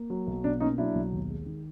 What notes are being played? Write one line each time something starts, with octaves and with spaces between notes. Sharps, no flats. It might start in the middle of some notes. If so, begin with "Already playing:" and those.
Already playing: A#3
F#3
B1
B2 D4
A#3 C#4 D#4
F#3 D4 E4
B1
D#2
G#3
D#3